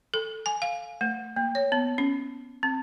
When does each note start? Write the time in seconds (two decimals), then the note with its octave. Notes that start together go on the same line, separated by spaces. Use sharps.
0.14 A4
0.46 G#5
0.62 F5
1.01 A3
1.36 A#3
1.55 C#5
1.72 B3
1.98 C#4
2.63 C4